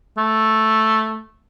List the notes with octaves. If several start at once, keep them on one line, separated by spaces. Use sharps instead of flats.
A3